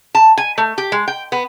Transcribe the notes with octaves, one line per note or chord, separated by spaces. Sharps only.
A5
G#5
A3
G4
G#3
G5
B3